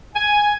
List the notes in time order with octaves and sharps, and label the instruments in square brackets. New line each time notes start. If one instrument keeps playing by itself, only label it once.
[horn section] G#5